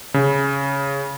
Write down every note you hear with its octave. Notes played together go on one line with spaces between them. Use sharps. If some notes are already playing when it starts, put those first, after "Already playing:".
C#3